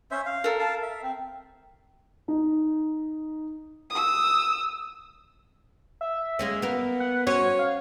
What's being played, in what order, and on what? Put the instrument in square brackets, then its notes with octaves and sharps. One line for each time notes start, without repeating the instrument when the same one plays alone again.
[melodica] C#4 C5 E5
F5
[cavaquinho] A4 A#4
[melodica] F5 A5
E5
C4
[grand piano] D#4
[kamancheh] D#6 E6
[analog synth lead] E5
[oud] G#3 A#3 C#4
[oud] A#3 A#4 [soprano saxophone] B3
[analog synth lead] F#5
[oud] C#4 C5 [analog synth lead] F#4 [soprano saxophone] C#5
[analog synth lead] F5